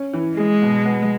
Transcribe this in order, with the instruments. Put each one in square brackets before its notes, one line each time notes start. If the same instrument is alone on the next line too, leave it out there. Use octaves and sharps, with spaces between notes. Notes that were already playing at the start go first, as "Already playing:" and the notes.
Already playing: [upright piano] C#4
E3
[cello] G#3 [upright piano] G#4
[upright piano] B2
B3